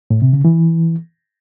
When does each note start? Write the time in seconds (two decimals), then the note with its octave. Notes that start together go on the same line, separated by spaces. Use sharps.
0.11 A2
0.22 C3
0.33 C#3
0.45 E3